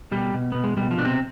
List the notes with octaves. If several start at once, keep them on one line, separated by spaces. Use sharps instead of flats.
B2 G3 G4
B2
B2 B3
G#3
B2 G3
F3
B2 D4
C3 C4